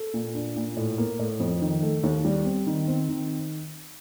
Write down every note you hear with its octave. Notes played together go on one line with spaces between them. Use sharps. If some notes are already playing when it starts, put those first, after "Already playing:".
Already playing: A4
A#2
D4
A#2
A2
A#3
A2
F2
D#3
A3
D#2
G3
C4
D#3
C4
D#3